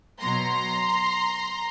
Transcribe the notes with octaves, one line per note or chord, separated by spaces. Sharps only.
B2 F#3 A#5 C6